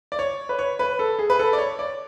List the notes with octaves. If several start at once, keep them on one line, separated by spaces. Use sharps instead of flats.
D5
C#5
B4
C#5
B4
A4
G#4
B4
A4
D5
C#5
D5